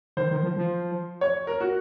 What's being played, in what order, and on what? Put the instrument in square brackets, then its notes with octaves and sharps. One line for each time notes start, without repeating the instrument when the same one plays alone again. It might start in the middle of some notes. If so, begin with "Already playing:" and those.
[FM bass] D#3 [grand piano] C5
[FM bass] D#3
F3
F3
[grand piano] C#5
A#4
F#4